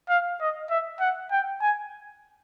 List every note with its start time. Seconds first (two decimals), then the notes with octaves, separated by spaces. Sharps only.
0.09 F5
0.40 D#5
0.70 E5
1.00 F#5
1.31 G5
1.61 G#5